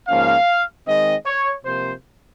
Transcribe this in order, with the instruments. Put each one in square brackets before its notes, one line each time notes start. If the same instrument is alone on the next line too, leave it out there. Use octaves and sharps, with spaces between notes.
[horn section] G#2 F3 A#3 C#4 F5
D#3 G#3 C4 D#5
C#5
C3 F3 A#3 C5